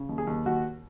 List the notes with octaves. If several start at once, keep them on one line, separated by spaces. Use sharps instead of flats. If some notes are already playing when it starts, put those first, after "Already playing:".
Already playing: C#3
D#2
G#4
D#2
D#2 F#4